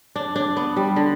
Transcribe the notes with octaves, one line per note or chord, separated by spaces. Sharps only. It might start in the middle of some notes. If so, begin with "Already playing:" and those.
D4
D4
B3
G3
D3